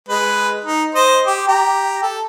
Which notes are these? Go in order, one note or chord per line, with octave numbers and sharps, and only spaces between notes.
G#3 B4
D#4
C5 D#5
G4 D6
G4 A#5
A4